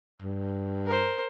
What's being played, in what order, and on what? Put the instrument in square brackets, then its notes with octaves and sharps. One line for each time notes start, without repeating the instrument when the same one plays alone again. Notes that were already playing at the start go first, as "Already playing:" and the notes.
[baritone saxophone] G2
[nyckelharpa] A#4 C5